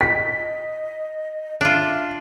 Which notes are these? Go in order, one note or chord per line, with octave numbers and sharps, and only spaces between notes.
D#5 B6
D4 F4 E5